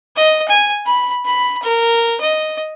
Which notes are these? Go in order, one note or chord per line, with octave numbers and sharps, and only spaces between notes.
D#5
G#5
B5
B5
A#4
D#5